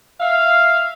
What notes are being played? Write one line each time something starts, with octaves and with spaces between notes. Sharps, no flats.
E5 F5